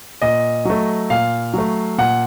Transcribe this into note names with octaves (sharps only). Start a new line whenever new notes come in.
A#2 D#5
F#3 A3
A#2 F5
F#3 A3
A#2 F#5